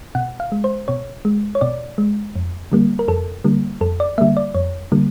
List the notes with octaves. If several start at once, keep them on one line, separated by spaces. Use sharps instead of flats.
B2 F#5
F5
G#3
C5
B2 C#5
G#3
C#5
B2 D5
G#3
F2
D3 G3 A#3
A#4
F2 A4
D3 G3 A#3
F2 A4
D5
D3 G3 A#3 E5
D5
F2 C#5
D3 G3 A#3